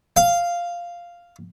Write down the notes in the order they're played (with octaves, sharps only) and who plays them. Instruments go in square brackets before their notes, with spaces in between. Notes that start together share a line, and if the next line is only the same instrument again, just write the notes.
[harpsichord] F5